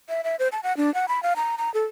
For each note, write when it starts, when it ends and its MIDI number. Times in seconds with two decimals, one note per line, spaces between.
0.09 0.22 76
0.24 0.36 76
0.39 0.48 72
0.52 0.60 81
0.63 0.75 78
0.77 0.93 62
0.94 1.06 78
1.08 1.22 83
1.23 1.34 77
1.36 1.56 82
1.58 1.72 82
1.74 1.86 69